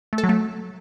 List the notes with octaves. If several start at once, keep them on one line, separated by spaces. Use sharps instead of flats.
A3
A4
F#3
A3